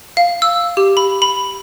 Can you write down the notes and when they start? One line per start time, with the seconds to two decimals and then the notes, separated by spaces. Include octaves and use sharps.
0.17 F5
0.42 E6
0.77 G4
0.97 B5
1.22 B5